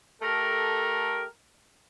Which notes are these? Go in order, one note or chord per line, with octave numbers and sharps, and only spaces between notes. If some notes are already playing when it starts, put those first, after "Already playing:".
A3 G4 A4 A#4